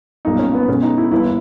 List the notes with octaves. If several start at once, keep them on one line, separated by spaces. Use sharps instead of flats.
B1 A#2 G3 A#3 D#4
C#4
B3
B1 B2 G#3 C#4
D#4
E4
G1 G2 E3 A#3 E4